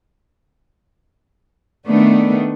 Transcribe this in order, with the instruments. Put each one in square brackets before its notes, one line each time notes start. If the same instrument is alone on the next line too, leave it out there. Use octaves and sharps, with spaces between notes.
[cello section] D#3 A3 B3 D4